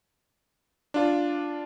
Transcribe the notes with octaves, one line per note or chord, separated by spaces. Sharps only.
D4 F4